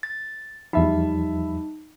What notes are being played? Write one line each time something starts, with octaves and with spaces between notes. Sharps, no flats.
A6
E2 F3 G3 D#4 E5 B5